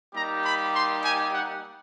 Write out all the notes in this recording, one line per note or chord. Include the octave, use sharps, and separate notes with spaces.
G3 A#3 D#4 G4 A#5
B5
C6
G#5
F#5